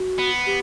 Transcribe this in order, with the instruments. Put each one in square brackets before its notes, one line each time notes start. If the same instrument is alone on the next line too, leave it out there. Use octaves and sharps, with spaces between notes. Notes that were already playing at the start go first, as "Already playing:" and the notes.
Already playing: [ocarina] F#4
[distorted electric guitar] B3
[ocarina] G4